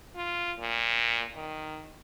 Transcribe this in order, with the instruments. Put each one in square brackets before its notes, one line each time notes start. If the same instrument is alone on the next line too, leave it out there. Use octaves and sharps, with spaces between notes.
[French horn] F4
A#2
D#3